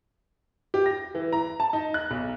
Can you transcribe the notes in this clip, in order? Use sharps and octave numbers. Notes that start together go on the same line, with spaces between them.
G4
A#6
E3
A#5
A5
D#4
F#6
B1